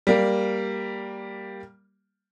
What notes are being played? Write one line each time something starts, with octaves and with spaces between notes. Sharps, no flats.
G3 A#3